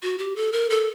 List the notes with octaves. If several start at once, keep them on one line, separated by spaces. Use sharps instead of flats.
F#4
G4
A4
A#4
A4